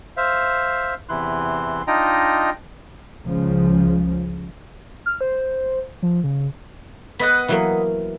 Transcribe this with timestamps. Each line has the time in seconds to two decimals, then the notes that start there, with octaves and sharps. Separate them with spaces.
0.17 C5 E5 F5
1.09 E2 C3 E3 E4 C6 F#6
1.87 D4 D#4 F4 D#5 G5 A#5
3.25 C#2 C#3 F3
5.06 F6
5.21 C5
6.02 F3
6.24 C#3
7.20 B3 B4 D#5 F#5
7.48 E3 F#3 A#3